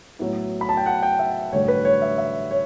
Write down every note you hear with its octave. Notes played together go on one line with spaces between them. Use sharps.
A2 F#3 B3 E4
B5
A5
G5
F#5
G5
E5
A1 G2 D3 F#3 C#5
B4
C#5
E5
E5
C#5